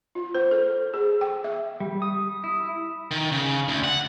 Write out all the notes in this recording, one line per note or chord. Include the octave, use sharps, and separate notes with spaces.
F4
C5
A4
G#4
G5
E5
G3
D#6
E4
D#3
C#3
D2
F#5